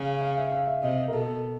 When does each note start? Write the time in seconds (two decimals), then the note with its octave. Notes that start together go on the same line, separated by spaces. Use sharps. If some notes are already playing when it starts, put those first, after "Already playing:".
Already playing: C#3 F5
0.21 F5
0.38 E5
0.52 F5
0.67 E5
0.82 C3 D#5
0.98 D#5
1.08 A#4
1.13 B2 A4